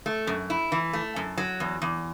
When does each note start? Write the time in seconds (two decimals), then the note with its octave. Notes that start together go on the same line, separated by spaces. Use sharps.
0.06 A3
0.27 F#2
0.50 E4
0.72 E3
0.93 A3
1.16 F#2
1.38 F#3
1.60 E2
1.82 E2